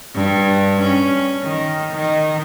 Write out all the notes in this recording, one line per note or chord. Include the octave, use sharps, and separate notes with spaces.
G2
C#4
D#3
D#3